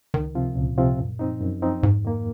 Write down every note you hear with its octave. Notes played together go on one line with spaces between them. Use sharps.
C#2 D#3
C3 F3 C4 F4
C#2 A#2
C3 F3 C4 F4
F#2
F3 C4 D#4
F#2
F3 C4 D#4
F2 G#2
D#3 A#3